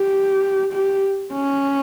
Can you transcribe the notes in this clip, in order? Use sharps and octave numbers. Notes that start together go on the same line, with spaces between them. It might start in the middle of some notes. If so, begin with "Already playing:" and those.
Already playing: G4
G4
C#4